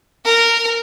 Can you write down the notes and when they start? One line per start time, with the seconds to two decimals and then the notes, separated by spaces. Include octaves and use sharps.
0.25 A#4